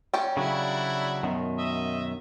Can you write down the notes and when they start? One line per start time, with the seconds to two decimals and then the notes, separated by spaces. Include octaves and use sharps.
0.14 G3 C#4 G5
0.37 C#3 F#3 D4 E4 F#4
1.23 F#2 B2 D#3
1.58 D#5 E5